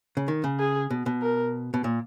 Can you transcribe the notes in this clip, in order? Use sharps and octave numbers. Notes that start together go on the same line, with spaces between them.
C#3
D#3
C#3
G#4
B2
B2
A#4
B2
A#2